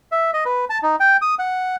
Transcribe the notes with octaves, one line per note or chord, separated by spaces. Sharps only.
E5
D#5
B4
A5
D#4
G5
D#6
F#5